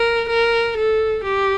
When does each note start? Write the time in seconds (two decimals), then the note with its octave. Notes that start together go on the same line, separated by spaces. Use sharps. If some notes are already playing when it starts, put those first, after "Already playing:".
Already playing: A#4
0.29 A#4
0.77 A4
1.24 G4